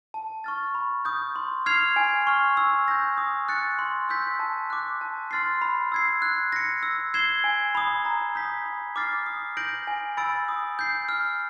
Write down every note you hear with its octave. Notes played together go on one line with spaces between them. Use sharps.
A5
C#6 F6 A6
B5
D#6 G6
C6
F6 G#6 C7 F7
G#5
C#6 F6
E6
G6 A#6
D#6
F#6 A6 C#7
C6
E6 G6 B6
A5
D6 F#6
A5
C6 F6 A6 C7
B5
E6 G#6 C7
F#6
A#6 C#7
E6
G#6 C7 E7 G7
G#5
B5 D#6
A#5
D#6 G6 B6
B5
D6 F6 A6 C7
D#6
G6 A#6 D7 F#7
G#5
B5 E6 A6 D7
D#6
G6 C7
F6